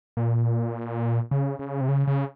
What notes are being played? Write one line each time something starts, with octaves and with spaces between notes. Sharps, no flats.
A#2
C#3
C#3
C3
C#3
C#3